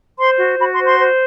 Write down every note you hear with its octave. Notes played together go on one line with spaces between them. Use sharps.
C5 C6
F#4
F#4 B5
C6
C5
C6
C5